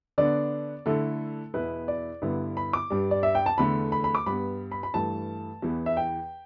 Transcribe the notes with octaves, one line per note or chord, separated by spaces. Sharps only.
D3 B3 D4 D5
D3 A3 E4 A4
E2 B2 B3 E4 B4
D5
G2 D3 B3 E4
B5
D6
G2 G3 D4
D5
E5
G5
A5
E2 D3 A3 B5
B5
B5
D6
G2 G3 B3 B5
B5
B5
G2 E3 A3 A5
E2 E3 B3
E5
G5